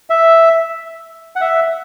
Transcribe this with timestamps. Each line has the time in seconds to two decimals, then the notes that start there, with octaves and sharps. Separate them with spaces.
0.10 E5
1.36 F#5
1.41 E5